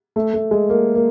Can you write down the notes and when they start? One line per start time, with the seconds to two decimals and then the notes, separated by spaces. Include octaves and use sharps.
0.16 A3
0.33 A3
0.51 G#3
0.69 A#3
0.95 A#3